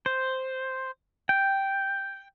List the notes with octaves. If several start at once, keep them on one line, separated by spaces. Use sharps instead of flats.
C5
G5